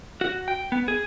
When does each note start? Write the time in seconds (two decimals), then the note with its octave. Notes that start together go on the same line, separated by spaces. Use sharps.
0.21 F#4
0.48 G5
0.72 B3
0.88 G#4